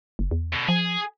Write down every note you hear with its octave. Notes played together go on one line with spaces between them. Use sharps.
F#1
E2
B2 D3
F3 G#4